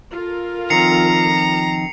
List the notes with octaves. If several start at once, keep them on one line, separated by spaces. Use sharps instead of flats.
F4 A4 A#4
D#3 F3 C4 A#5 C7 C#7 F7